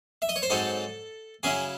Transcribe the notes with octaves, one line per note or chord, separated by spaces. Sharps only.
E5
D#5
C#5
C5
G#2 F#3 C4 D#4 A4
C#3 F#3 C#4 E4 G#4